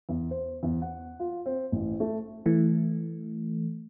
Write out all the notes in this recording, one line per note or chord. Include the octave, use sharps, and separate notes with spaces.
E2
C5
E2
F#5
F4
C4
A1
A3
E3 A3